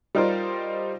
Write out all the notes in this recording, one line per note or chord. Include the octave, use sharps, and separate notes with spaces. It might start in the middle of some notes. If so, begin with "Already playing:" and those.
G3 D#4 F4 A#4 C5 D5